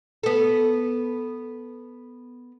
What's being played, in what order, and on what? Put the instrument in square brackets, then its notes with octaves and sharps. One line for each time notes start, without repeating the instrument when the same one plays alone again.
[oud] B3 A4